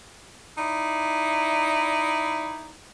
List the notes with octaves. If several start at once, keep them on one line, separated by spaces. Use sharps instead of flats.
D#4 E4 D5